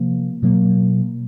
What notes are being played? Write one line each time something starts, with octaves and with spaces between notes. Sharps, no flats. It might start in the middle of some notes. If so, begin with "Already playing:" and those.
Already playing: C3 F3 A#3
B2 F#3 A#3